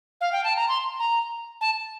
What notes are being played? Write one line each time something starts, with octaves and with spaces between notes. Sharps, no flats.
F5
G5
A5
A#5
C6
A#5
A5